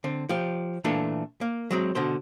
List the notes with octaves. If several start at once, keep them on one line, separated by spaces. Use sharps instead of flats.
D3 C4
F3 G4
A#2 E3 A3 D4 F4 A4
A#3
F#3 G#3 C4
B2 D3 C5